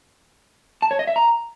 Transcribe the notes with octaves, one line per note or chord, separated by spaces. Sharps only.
A5
C#5
D#5
E5
A#5